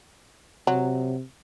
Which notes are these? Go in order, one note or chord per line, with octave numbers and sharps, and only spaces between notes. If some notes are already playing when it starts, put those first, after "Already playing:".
C3 F#3